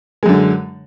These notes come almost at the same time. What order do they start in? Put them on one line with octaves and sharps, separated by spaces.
G#3 F#2 D3